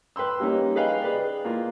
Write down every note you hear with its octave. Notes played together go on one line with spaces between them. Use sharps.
B4 G5 C6 E6
G3 A#3 C#4 D#4
G#4 B4 D#5 F5 G5 G#5
G#4 B4 D5
A#3 F4